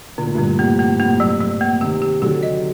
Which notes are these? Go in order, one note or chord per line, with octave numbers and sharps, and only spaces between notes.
A#2 D3
A2
G2 A#2 D3
A2 C3 A#3
A#3
A2 C3 A#3
F#3
F#3
A#3
C3 D#3 G4
G4
D3 F#3 G4
D#5